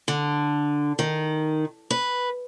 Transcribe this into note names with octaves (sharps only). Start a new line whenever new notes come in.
D3
D#3
B4